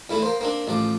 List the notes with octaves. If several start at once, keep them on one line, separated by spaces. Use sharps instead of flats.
E2 E3 A3 E4
A#3 C5
A#3 C4 D4
A1 F3 D5